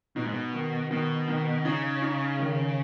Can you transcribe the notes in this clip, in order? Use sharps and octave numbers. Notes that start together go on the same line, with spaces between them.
B2 D#4
G#2
B2
D#3
B2 D#3
D#3
C#3 D#4
D#4
D#3